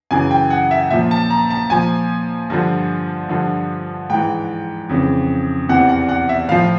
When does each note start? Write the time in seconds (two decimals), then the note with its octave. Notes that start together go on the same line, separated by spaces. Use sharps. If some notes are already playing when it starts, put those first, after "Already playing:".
0.11 F#2 C#3 E3 G#5
0.31 G5
0.50 F#5
0.71 E5
0.90 A#2 F3 E5
1.11 A5
1.30 A#5
1.50 A5
1.70 A#2 F3 G#5
2.50 G2 D3 F3
3.29 G2 D3 F3
4.10 G#2 E3 G5
4.89 F2 C#3 E3
5.69 E2 C3 E3 F#5
5.89 F#5
6.09 F#5
6.29 E5
6.49 A2 F3 F5